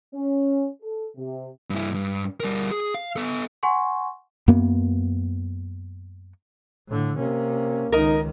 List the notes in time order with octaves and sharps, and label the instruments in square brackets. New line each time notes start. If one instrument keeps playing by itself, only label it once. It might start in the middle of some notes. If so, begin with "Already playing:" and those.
[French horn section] C#4
A4
C3
[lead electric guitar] G2 E4
G2
G3 A#4
G#4
F5
B3 A4
[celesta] F#5 G#5 C6 C#6
[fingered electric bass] F#2 A#3 B3
[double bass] A2 D3
[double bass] C3 C#4 [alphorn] A#3
[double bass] C#2 D#3 [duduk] D#4 [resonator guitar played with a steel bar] A#4 D#5